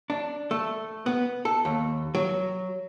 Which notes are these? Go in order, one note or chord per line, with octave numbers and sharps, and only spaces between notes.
D4
A3
B3
A4
D#2
F#3